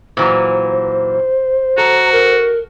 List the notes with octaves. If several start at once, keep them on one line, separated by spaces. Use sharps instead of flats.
A#2 E3 F#3 C5
F#4 A4 A#5
A#4